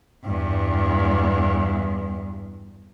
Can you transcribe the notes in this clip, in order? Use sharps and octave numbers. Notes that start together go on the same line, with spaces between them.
E2 G2